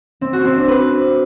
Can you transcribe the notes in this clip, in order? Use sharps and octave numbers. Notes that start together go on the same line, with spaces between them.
C4
F#4
C4
D4
B4